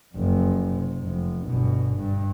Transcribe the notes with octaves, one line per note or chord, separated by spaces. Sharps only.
F#1 F2
C3
F1
G1 B2
G2